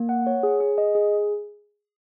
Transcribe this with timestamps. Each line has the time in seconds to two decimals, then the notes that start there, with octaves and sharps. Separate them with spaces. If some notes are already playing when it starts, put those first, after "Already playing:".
Already playing: A#3
0.09 F#5
0.27 C#5
0.43 G#4
0.60 G#4
0.78 D#5
0.95 G#4